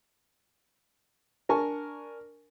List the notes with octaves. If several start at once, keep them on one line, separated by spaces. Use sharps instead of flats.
D4 A#4 G#5 A5 C#6